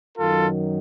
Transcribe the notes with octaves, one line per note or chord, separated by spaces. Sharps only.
F#2 D#3 F#3 F4 A4